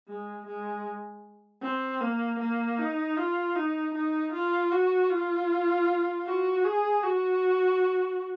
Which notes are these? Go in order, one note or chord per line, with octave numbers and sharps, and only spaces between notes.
G#3
G#3
C4
A#3
A#3
D#4
F4
D#4
D#4
F4
F#4
F4
F#4
G#4
F#4